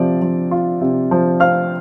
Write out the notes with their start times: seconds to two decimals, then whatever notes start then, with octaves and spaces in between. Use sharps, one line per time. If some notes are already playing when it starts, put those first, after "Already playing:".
Already playing: C3 F3 D5
0.22 F3
0.51 F4
0.81 C3
1.11 F3
1.40 C4 F5 F6